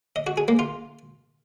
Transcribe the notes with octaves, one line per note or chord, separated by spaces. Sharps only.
D#5
F#4
G#4
A#3
F4